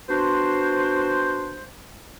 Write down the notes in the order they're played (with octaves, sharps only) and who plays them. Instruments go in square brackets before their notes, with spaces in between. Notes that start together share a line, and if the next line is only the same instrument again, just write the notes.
[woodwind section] B3 D4 F#4 C5